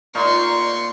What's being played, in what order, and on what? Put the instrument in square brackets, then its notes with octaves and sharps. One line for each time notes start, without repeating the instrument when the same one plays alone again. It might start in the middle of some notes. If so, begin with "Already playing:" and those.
[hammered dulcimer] A#2 D#4 F5 [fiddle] C6 C#6